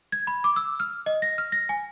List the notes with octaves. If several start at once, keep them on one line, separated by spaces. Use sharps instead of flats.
G#6
B5
D6
E6
F6
D#5
A#6
F6
A#6
G#5